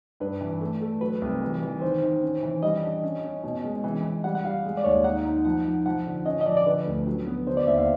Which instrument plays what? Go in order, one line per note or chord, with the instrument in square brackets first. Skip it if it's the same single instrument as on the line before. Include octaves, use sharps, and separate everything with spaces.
[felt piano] G2 [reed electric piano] B4
[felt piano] E3
A3
A3
[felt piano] F#3 [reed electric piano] B4
[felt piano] C2
E3
E3
[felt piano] D#3 [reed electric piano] C5
[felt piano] D#3
C#4
E3
[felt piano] G3 [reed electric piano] D#5
[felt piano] D4
C#4
C#4
B2
G#3
E3
E3
[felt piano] G3 [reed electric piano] F#5
[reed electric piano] F#5
[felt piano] G3 [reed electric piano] F5
[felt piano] G#3
[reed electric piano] D5
[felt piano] D#2 [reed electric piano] C#5
[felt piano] D#4 [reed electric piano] F#5
[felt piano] D#4
[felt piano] F3 [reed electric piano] F#5
[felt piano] F3
[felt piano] F3 [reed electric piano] F#5
[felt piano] D3
[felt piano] C#4 [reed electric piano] D#5
[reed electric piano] D#5
[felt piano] F3 [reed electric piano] D5
[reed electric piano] D5
[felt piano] D3 [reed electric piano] B4
[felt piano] D2
F#3
B3
[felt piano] D3 [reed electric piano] C5
[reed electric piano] D5
[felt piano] D#2 [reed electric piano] E5
[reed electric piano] F5